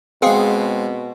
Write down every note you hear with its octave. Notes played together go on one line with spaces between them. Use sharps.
B2 G#3 C4 G#4 F5 F#5